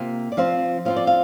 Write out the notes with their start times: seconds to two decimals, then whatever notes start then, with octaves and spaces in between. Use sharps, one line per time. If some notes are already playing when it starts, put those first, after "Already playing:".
Already playing: C3 A#3 F4
0.32 D5
0.37 F3 C4 F4 F5
0.85 F3 C4 F4 F5
0.96 D5
1.07 F5